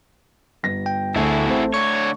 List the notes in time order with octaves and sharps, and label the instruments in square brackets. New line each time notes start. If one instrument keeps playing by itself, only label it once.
[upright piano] G1 A#6
[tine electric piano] G5
[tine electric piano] D2 D3 [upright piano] A3 [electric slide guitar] E4 F#4 G#4
[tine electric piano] A1 C4 C5
[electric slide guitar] D3 C#5 [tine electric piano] C#6